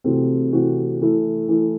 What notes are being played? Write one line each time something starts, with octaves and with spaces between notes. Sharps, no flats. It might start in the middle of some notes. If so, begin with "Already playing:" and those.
C3 E3 A3 C4 F#4
C3 E3 A3 C4 F#4
E3 A3 E4
E3 A3 E4